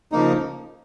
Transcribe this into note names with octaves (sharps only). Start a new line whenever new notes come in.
C#3 F3 A#3 D#4